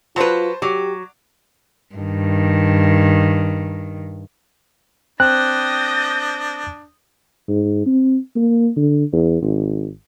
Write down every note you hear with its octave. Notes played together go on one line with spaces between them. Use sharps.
F#3 F4 B4 C5 A5
F#3 G4 D6
G2 D#3
C4 D4 D#6 F#6 G6 A#6
G#2
C4
A#3
D3
E2
G#1